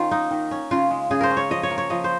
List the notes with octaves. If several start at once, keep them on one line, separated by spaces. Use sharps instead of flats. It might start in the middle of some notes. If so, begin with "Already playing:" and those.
Already playing: D#3 C#4 F4
A#3 D#4
D#3
C#4
C#3 F4
G#3
C#3 G#4
A#4 C5
C#4
C#5
F3 D#5
C#5
A#3
C#5
F3 D#5
C5